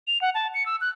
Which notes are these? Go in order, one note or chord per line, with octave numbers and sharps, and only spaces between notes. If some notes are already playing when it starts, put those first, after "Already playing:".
F7
F#5
A5
C#7
E6
F#6